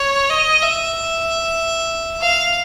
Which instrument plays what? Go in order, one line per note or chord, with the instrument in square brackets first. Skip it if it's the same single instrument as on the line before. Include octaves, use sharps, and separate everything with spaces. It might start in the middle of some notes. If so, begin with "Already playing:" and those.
Already playing: [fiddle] C#5
D#5
E5
F5